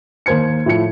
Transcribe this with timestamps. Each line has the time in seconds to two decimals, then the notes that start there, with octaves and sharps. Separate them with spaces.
0.26 D#2 A#3 C5 G#6 C#7
0.66 A2 F3 C#7